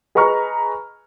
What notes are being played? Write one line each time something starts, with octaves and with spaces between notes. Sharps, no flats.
G#4 B4 D#5 A#5 C#6 F6